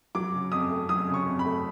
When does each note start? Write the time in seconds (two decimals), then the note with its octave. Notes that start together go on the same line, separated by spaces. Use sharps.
0.15 F#3 D6
0.33 C#3
0.52 F2 D#6
0.70 A3
0.89 F#3 D#6
1.08 C#3
1.14 C#6
1.26 F2
1.39 B5
1.45 A3